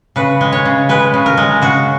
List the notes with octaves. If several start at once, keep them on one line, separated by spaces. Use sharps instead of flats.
C#3 B4
G#3
C#5
C#3
G#3 B4
C#3
A#4
G#3
C#3 F#4